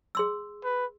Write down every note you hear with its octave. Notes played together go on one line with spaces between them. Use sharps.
G#4 C6 E6
B4